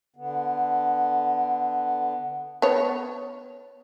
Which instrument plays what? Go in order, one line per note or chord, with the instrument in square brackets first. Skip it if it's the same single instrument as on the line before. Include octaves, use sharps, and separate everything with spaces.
[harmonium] D3 B3
[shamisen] B3 C#5